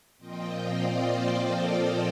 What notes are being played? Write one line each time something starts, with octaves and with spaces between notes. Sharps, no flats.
A#2 F3 C4 F4 D#5 G5
D5 F5
C5 D#5
A4 C5